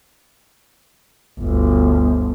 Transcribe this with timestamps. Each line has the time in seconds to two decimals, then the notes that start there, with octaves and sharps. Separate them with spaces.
1.39 G1 D2